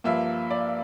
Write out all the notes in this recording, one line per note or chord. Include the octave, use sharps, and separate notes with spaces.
G2 F3 A#3 E5
D5